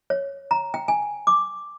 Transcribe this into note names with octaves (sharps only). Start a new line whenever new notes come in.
C#5
A#5
G5
G#5
D6